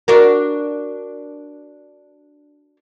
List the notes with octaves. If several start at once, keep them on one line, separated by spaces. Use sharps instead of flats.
D4 F#4 A#4